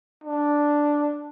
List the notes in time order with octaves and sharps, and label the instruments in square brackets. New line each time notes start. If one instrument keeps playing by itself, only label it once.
[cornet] D4